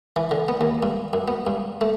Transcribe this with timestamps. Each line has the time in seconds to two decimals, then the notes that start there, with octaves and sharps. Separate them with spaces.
0.16 E3
0.31 D3
0.48 B3
0.61 D#2
0.83 G2
1.13 F#2
1.28 B3
1.47 G2
1.81 A3